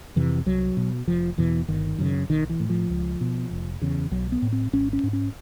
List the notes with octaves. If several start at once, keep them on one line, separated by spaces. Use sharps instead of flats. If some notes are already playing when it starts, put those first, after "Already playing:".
F2 C3 E3
C2 F#3
B2
F1 F3
E2 B2 E3
G1 D#3
F#2 C#3
B1 D#3
E3
A2
F3
C#2
B2
F1
E2 C#3
B1 F#3
B3
A2
C4
G#1 C#4
C#4
G#2
C#4